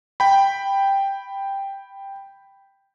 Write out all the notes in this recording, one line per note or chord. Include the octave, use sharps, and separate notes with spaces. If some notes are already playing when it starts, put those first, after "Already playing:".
G5 B5